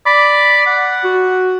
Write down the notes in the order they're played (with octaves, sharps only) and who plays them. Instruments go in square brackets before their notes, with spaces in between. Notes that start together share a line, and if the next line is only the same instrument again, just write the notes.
[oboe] D5 [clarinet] B5
[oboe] F#5
[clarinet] F#4